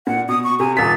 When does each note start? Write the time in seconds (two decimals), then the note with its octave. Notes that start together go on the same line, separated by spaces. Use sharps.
0.07 A#2 F#5
0.29 B2 D#6
0.44 C#6
0.59 C3 G#5
0.77 D#1 A6 B6